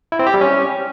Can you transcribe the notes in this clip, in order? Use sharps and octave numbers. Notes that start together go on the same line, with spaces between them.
E4
C4
G4
G3
C#4